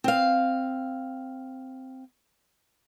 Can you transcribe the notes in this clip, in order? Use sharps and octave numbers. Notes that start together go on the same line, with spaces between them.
C4 F5